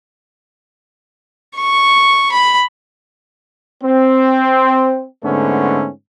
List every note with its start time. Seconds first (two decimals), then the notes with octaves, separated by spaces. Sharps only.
1.56 C#6
2.32 B5
3.83 C4
5.24 G#2 D3 A3 B3 C#4